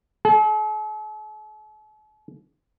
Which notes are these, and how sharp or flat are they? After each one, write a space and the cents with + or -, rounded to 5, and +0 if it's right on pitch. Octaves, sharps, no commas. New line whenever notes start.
A4 -45